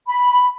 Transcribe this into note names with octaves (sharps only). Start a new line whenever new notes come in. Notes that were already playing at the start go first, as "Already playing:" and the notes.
B5